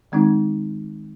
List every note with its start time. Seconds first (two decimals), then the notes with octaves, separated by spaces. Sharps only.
0.12 D#3 G#3 C4 D#4